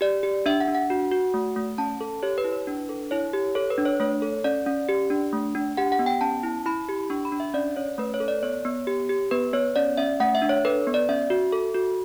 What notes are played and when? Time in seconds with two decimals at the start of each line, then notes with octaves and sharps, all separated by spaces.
0.01 G4 D5
0.23 G4
0.46 D4 E5
0.60 F#5
0.68 D4
0.75 F#5
0.90 F#4
1.11 F#4
1.34 A3
1.56 A3
1.78 C#4 A5
2.01 A4
2.23 G4 C#5
2.38 B4
2.44 E4
2.53 B4
2.67 D4
2.89 A4
3.11 E4 C#5
3.33 G4
3.55 A4 C#5
3.70 B4
3.78 D4
3.85 C#5
4.00 A3 C#5
4.22 A4
4.44 C#4 D5
4.66 C#4
4.89 G4
5.10 D4
5.33 A3
5.55 D4
5.77 G4 F#5
5.92 F#5
5.99 B3
6.06 G5
6.21 C#4 A5
6.43 E4
6.66 E4 B5
6.88 G4
7.10 D4 C#6
7.25 B5
7.32 D4
7.40 E5
7.54 C#4 D5
7.76 C#4 C#5
7.98 A3 B4
8.14 C#5
8.20 A4
8.28 D5
8.43 B3 C#5
8.65 B3
8.87 G4
9.09 G4
9.31 B3 B4
9.53 B3 C#5
9.76 C#4 D5
9.97 C#4 E5
10.20 A3 F#5
10.35 E5
10.42 D4
10.49 C#5
10.65 A4 B4
10.87 B3
10.94 D5
11.09 C#4 E5
11.30 F#4
11.52 A4
11.75 F#4